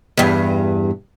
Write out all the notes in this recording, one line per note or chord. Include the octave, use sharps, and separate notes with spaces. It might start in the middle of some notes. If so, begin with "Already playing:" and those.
E2 G2